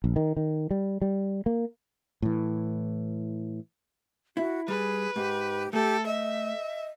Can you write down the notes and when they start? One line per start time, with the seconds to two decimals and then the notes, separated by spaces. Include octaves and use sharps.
0.04 A#1
0.16 D#3
0.37 D#3
0.71 G3
1.02 G3
1.46 A#3
2.22 A2 E3
4.37 E4 F#4
4.68 G3 G#4 B4
5.16 G#2 G4
5.73 A3 G4 A4
6.06 D#5 E5